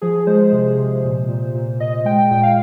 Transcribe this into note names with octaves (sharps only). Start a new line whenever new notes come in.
F3 G#4
G#3 C5
C3
C3
A#2
A#2
A#2
A#2 D#5
G#3 G5
G5
A#2 G5
F5